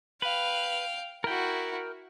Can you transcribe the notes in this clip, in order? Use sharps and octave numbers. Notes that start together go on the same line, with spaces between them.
B4 F5 G5
E4 F#4 A#4 G5